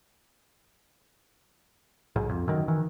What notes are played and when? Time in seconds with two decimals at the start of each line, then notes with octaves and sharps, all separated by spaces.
2.16 B1 G#2
2.29 F2
2.48 F#2 D#3
2.68 D#3 E3